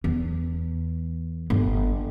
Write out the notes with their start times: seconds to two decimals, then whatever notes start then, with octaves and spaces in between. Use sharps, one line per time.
0.04 E2
1.50 G1